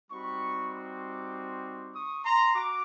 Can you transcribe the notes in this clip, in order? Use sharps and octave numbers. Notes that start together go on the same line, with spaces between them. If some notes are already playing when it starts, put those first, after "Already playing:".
G3 C4 D#4 F#4 B5 C#6
C6 D6
C#6 D#6
A#5 C6
F#4 D6